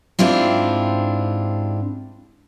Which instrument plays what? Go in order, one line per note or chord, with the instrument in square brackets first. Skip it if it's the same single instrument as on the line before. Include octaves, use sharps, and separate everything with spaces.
[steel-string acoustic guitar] G#2 C4 D4 E4 F4 G4